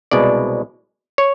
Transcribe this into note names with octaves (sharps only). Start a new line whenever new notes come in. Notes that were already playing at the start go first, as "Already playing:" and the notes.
C2 B2 G#3 D5
C#5